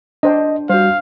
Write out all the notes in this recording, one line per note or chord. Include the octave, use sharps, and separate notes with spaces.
D4 C5 D#5 G5
G3 F#4 C5 F5